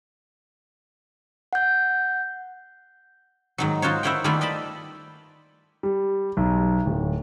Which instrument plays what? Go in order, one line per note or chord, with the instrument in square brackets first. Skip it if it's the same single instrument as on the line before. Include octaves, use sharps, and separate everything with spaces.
[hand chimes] F#5 G6
[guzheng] G#2 D#3 F#3
D#4 F4 F#4 C5 C#5
E4 A#4 C5 C#5 F#5 G5
D#3 G3 A3 A#3 E4 F4
D5 D#5 A5 B5
[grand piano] G3
B1
D1